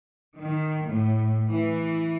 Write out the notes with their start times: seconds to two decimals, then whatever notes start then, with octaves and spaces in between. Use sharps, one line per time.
0.36 D#3
0.85 A2
1.48 E3